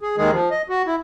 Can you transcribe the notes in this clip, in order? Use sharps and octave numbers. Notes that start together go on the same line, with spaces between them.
G#4
D#2 D#3 G#3 G#4
F3
D#5
F#4
E4